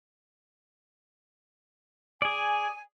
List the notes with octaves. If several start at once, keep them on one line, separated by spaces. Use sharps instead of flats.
G#4 D5 G#5